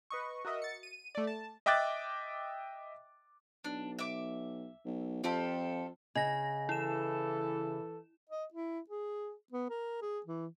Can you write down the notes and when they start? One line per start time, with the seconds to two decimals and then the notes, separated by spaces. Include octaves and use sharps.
0.10 B4 D#5 C#6
0.45 F#4 A#4 D#5 E5
0.62 A6 C#7
0.83 D#7
1.15 A3 D5
1.27 A5
1.66 D#5 E5 G5 D6 F#6 A6
3.64 B1 D4
3.99 E5 D6
4.85 B1
5.24 F2 F4 G4 A4
6.15 C#3 D#5 A#6
6.69 E3 E4 A4 E7
8.30 D#5
8.54 E4
8.90 G#4
9.52 B3
9.70 A#4
10.02 G#4
10.26 E3